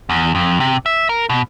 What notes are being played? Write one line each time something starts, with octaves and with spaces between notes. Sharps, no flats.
E2
F2
C3
E5
A#4
B2